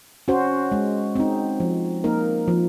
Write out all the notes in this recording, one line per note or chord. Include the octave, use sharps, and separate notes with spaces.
C#4 F#4 C5
G#3
C4 D#4
F3
A#3 D#4 A#4
F3